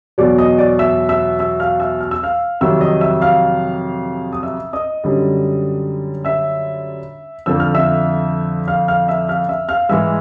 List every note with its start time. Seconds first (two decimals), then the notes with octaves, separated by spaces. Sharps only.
0.18 E2 B2 F#3 D5 D6
0.38 D#5 D#6
0.58 D5 D6
0.79 E5 E6
1.09 E5 E6
1.39 E5 E6
1.60 F5 F6
1.80 E5 E6
2.01 F6
2.11 E6
2.23 F5 F6
2.61 F2 C3 D#3 F#3 E5 E6
2.81 D#5 D#6
3.01 E5 E6
3.21 F5 F6
4.32 D#6
4.43 E5 E6
4.73 D#5 D#6
5.04 F#2 D3 G3
6.25 E5 E6
7.46 F2 D3 F3 E6
7.60 F6
7.75 E5 E6
8.68 F5 F6
8.88 F5 F6
9.08 E5 E6
9.29 F5 F6
9.49 E5 E6
9.69 F5 F6
9.89 G#2 E3 G#3 E5 E6